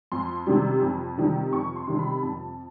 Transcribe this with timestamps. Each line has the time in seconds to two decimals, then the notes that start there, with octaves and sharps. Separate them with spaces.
0.12 F2 C6
0.47 C3 D#3 G3
0.82 F2
1.17 C3 D#3 G3
1.52 F2 C#6
1.76 C6
1.87 C3 D#3 G3 C6
1.99 B5
2.22 F2 A5